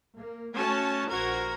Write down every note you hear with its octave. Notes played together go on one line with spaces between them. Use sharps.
A#3
A3 C#4 F#4 C#5 A5
A#1 F#4 A#4 C5 G#6